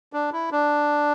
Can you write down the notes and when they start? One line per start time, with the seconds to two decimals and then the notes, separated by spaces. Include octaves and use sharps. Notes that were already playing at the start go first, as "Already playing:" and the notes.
0.13 D4
0.33 E4
0.52 D4